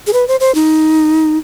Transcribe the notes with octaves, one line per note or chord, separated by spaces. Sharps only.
G#4
B4
C5
C5
D#4